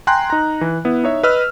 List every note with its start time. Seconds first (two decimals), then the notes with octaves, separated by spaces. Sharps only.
0.07 G5 G#5 A#5 C6 F#6
0.30 D#4 A#5
0.61 E3
0.85 B3 E4
1.04 D#4 C#5 E5
1.23 B4 D#5 E6 F6